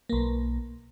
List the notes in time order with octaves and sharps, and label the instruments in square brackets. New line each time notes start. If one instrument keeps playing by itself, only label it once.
[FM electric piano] B1 A#3